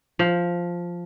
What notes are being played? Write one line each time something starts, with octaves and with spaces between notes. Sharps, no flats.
F3